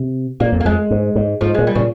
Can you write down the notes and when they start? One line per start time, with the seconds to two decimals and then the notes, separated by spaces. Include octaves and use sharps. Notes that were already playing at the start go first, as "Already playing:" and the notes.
Already playing: C3
0.40 A#2 A#3
0.52 F2
0.60 A#3
0.65 F2 G#3
0.91 G#2
1.16 G#2
1.41 G#2 F3
1.54 G#3
1.58 A#2
1.67 G3
1.75 A#2 C#3